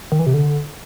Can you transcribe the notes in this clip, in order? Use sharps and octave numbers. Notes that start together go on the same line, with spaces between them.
D#3
E3
C3
D3